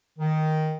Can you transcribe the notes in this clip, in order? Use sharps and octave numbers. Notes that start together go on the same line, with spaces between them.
D#3